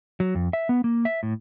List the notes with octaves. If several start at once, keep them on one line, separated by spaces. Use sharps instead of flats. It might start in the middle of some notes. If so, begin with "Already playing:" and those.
F#3
F2
E5
B3
A#3
E5
A2